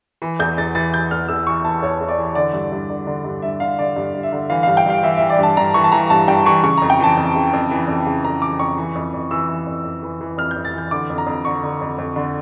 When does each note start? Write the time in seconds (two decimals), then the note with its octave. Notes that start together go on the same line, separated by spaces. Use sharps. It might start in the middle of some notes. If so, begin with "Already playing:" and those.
0.22 E3
0.39 E2 G6
0.58 E2 A6
0.75 E3 A6
0.93 E3 G6
1.11 E2 F6
1.28 E2 E6
1.47 E3 C#6
1.64 E3 A5
1.82 E2 C#5
2.00 E2
2.09 D5
2.18 E3
2.35 D3 D5
2.53 G2
2.72 G2
2.90 D3
3.07 D3
3.24 G2
3.42 G2 E5
3.60 D3 F5
3.78 D3 D5
3.96 G2
4.14 G2
4.23 E5
4.32 D3
4.50 E3 F5
4.63 G2 F5
4.77 G5
4.86 G2 F5
5.03 E3 E5
5.17 E3 E5
5.30 D5
5.39 G2 A5
5.57 G2 A#5
5.74 E3 C#6
5.84 A5
5.92 E3 A#5
6.10 G2 A5
6.28 G2 G5
6.45 E3 C#6
6.63 C#3 C#6
6.77 F2 A#5
6.90 G5
7.00 E3 A5
7.17 F2
7.36 C#3
7.53 F2
7.71 E3
7.88 F2
8.06 C#3
8.24 F2 A#5
8.42 E3 D6
8.59 F2 C#6
8.77 E3
8.95 F2
9.14 F2
9.31 E3 E6
9.48 E3
9.67 F2
9.84 F2
10.03 E3
10.21 E3
10.38 F2 F6
10.51 G6
10.56 F2
10.65 A6
10.74 E3 G6
10.91 D3 D6
11.10 F2
11.18 A#5
11.27 F2
11.45 D3 C#6
11.63 D3
11.81 F2
11.98 F2
12.16 D3